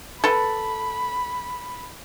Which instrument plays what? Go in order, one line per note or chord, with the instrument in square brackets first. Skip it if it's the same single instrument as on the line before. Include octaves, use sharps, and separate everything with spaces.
[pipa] A4 B4 [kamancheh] B5